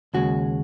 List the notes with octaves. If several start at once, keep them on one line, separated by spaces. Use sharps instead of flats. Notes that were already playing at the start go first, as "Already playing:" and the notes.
D#2 C#3 G#3 F#4